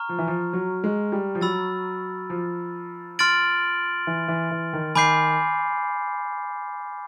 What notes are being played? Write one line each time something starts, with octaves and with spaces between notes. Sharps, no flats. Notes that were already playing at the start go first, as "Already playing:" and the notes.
Already playing: A#5 C#6 F6
F3
E3
F3
F#3
G#3
G3
F3
F#3 B5 E6 A6
F3
C6 F6 A6 D7 F#7
E3
E3
E3
D#3
D#3 G#5 B5 D6 G6 C7